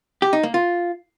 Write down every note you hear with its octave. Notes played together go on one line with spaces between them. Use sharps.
G4
D#4
A#3
F4